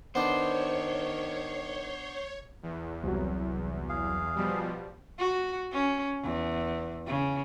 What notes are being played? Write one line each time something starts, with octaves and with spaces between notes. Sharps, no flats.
D#3 B3 D4 C5 C#5
E2
C2 F#3
G#4 F5
B2 F3 G3
F#4
C#4
E2
C#3